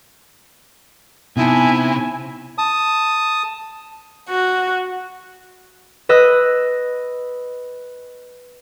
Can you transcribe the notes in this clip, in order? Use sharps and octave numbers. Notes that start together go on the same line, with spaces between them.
C3 B3 D#4 E4 G#5 A5
A5 D#6
F#4
B4 D#5 E6 F#6